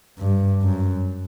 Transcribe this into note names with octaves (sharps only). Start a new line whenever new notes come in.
G2
F#2